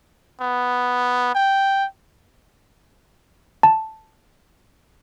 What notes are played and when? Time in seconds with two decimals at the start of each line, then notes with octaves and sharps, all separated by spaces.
0.41 B3
1.35 G5
3.63 A5